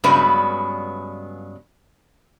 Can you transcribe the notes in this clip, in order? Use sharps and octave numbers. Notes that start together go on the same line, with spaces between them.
G2 C#3 F#3 G#3 B3 B4